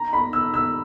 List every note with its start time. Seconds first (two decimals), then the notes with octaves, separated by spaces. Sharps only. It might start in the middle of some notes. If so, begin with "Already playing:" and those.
Already playing: A#5
0.13 B5
0.33 E6
0.54 E6